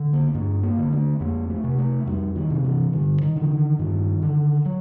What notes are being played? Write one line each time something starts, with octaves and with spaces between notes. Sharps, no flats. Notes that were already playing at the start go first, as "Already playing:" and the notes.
Already playing: D3
A#3
G2 A3
A#3
D3
A3
F2 A#3
A3
C3
A3
F2 G3
D#3
C3
E3
G2 D3
D#3
D3
E3
D#3
G2 D#3
D3
F#3